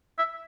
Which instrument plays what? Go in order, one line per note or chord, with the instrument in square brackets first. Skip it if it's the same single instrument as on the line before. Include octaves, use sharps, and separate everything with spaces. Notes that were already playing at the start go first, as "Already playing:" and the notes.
[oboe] E5